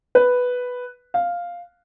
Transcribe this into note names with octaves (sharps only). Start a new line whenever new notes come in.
B4
F5